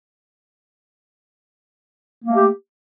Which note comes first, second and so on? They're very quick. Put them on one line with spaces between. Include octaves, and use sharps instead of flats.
A#3 A3 G4